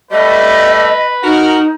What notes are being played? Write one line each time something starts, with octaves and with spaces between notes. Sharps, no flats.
G3 A3 B4 D#5
D#4 F#4 A#4